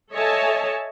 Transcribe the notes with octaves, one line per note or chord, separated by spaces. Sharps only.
A4 C#5 D#5 E5 G#5 A5